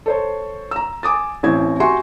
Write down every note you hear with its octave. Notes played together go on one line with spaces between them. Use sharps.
A4 C5 C#5
A#5 E6
G#5 D6 D#6 A6
A1 E3 C4 G#6
F#4 G4 E5 G#5 C6 C#6